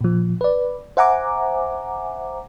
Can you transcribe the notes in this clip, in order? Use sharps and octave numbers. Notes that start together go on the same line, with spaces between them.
A#2 F3
B4 D5
C5 E5 F#5 G#5 A#5 D6